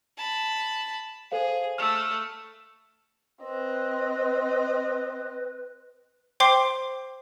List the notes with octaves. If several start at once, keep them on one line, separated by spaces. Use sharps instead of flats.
A5 B5
G#4 A4 C5 F5
A3 E6 F6
C4 B4 D#5
C5 G5 C6 D6 C7